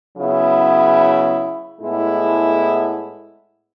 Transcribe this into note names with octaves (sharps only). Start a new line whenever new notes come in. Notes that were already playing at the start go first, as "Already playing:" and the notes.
C#3 F#3 B3 E4
A2 G#3 B3 E4